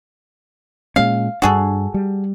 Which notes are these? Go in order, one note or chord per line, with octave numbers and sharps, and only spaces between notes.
A#2 G#3 C#4 F5
G2 D4 F#4 G#4 A4
G3